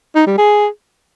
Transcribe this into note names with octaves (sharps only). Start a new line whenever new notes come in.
D#4
G3
G#4